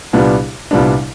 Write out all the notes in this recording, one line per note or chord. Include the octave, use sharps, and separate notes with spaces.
C2 A#2 G3 B3 D4
C2 A#2 G3 B3 D4